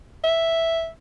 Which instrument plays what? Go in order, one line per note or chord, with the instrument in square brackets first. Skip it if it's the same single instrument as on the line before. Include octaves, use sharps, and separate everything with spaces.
[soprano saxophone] E5